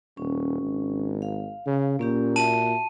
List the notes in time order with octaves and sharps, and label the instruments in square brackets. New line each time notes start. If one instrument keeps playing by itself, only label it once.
[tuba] D#1 [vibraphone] C#4
[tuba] G#1
[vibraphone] F5
[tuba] C#3
[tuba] A#2 [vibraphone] A#3 C#4 G4
[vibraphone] F#4 E5 [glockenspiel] A5 D#7